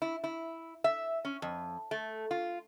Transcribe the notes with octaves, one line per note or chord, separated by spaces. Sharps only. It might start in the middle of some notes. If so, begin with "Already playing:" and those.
E4
E4
E5
C#4
F2
A3
F4